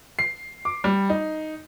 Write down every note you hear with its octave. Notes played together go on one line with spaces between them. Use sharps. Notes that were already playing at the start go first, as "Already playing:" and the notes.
C7
D6
G3
D#4